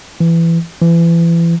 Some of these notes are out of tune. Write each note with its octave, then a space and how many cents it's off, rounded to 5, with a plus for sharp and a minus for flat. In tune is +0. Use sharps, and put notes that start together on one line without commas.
E3 +15
E3 +30